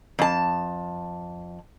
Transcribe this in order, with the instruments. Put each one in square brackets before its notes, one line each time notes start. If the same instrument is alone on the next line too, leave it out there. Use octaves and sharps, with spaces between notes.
[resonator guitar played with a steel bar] F2 A5